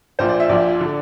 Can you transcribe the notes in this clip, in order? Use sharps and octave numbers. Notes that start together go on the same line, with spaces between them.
A#1 A#2 F3 C5
D5
E5
A#1 A#2 F3 D5
D3